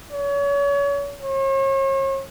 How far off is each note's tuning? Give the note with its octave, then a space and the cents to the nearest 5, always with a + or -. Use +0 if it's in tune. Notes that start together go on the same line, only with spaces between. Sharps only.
C#5 +35
C#5 -40